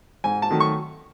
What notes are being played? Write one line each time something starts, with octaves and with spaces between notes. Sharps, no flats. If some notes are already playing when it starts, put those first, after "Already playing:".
G#2 G#5
A5
D#3 F#3 A3
C#6